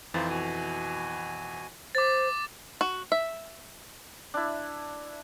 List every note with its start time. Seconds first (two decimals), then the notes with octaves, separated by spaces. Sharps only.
0.14 F2 E3 D#4 F4 C5 A6
0.29 B2 F#4 G#5
1.95 C5 D6 A6
2.81 F#4
3.12 E5
4.34 D4 E4